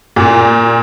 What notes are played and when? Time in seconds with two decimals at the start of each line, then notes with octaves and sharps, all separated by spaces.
0.16 A#2